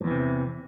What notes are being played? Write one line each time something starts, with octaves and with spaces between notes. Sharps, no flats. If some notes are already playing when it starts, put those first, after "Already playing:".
E2 G2 C3 E3